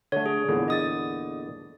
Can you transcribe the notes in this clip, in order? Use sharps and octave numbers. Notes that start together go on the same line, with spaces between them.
D3 A3 C#5
G#4
E2 A#2 D3
D#5 D#6 A6